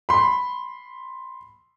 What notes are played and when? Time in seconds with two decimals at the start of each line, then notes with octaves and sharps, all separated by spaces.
0.09 B5 C6